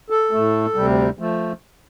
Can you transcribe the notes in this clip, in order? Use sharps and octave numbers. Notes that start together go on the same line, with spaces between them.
A4
A2 A3
D2 C3 G3
F3 A3